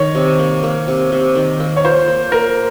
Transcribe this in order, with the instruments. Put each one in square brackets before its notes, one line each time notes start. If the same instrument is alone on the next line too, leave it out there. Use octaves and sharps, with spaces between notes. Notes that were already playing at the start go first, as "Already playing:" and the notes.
Already playing: [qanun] D#3 [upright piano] C#5
[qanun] C3
A#3
A#3
C3
C3
D#3
A#3
[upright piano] C#5
[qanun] F4 [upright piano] C5
[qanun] A#3
[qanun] A#3 [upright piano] A#4